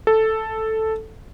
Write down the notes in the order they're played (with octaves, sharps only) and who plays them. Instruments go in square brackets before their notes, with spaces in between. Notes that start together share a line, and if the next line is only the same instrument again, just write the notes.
[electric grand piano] A4